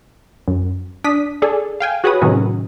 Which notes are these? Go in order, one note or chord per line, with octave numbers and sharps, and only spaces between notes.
F#2
D4 D#6 B6
G#4 A4 D5
F5 G5 G#5
F#4 G#4 B4 C#5 B5 D#6
A2 C3 D#3 F#3 C#4